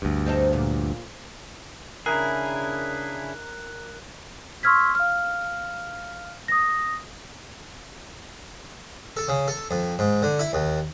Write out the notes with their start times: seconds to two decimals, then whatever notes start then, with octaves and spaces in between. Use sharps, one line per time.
0.02 D2 G2
0.26 C4 D#4 A4
0.53 A#2
2.06 C#3 D4 E4 G#4 A#4 F#6
4.63 C6 C#6 E6 F6 G#6 B6
4.95 F5 F6
6.48 D#6 A#6
9.17 A4
9.28 C#3
9.48 A4
9.71 F2
9.99 G#2
10.22 D3
10.39 E4
10.53 D#2